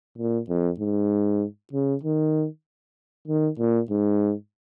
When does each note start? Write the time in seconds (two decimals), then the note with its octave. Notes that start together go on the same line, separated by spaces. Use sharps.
0.18 A#2
0.49 F2
0.80 G#2
1.73 C#3
2.03 D#3
3.28 D#3
3.59 A#2
3.90 G#2